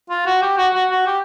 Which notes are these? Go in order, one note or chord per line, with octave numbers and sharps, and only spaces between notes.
F4
F#4
G4
F#4
F#4
F#4
G4